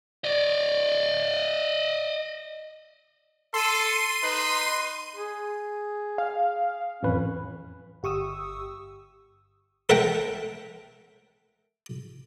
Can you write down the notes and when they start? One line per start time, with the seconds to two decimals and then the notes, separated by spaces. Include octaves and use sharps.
0.24 D5 D#5
3.54 A4 C6 D#7
4.22 D#4 B4
5.15 G#4
6.18 F5
7.03 A1 F2 C#4 B4
8.03 G1 G4 C#6 D#6 E6
9.89 A4 A#4 E5 F#5 G5